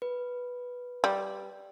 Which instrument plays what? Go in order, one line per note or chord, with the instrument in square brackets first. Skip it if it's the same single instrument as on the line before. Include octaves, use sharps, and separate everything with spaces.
[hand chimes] B4
[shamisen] G3